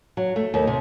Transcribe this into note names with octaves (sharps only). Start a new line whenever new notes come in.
F#3
A3
D#2
C3